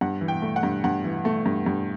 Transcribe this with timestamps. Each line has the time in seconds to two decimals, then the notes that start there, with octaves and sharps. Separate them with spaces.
0.01 G2 F#5
0.21 E3
0.28 G5
0.42 A3
0.56 F#5
0.63 G2
0.84 G2 F#5
1.04 E3
1.25 A3
1.46 G2
1.66 G2